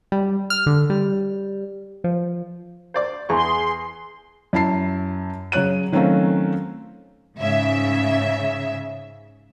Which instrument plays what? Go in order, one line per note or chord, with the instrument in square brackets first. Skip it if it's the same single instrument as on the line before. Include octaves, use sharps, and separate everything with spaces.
[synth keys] G3
F6
D3
G3
F3
[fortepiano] C5 D5 D6
[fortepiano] E2 C#6 [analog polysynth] G#4 C6
[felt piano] F#2 E4 A5 C7
C#3 F#3 C#5 F#6 D#7
D#3 F#3 A3 C4 C#4 F4
[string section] G#2 C#3 E5